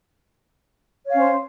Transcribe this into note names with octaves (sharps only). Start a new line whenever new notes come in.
C#4 C5 C#5 F5